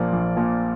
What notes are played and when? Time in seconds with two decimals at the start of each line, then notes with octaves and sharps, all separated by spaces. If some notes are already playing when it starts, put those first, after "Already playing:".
Already playing: A#1 A#2 F3 A#3 D5
0.13 A#1
0.36 A#2 F3 A#3